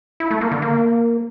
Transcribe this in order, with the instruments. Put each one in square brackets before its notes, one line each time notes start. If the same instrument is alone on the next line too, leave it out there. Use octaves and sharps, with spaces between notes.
[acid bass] E4
A3
A#3
D3
A#3